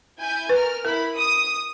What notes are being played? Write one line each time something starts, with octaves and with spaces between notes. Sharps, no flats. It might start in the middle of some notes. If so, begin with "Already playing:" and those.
E4 G#5 G6
A#4 B4 F6
E4 A#4 B5
D#6